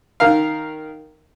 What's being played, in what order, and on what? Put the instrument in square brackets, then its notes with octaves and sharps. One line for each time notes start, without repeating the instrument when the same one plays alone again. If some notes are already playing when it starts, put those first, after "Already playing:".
[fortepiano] D#3 A#4 F5